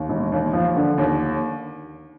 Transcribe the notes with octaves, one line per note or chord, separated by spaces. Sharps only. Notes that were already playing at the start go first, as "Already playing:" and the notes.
Already playing: D#2
E1
D#2
F3
D3
D#2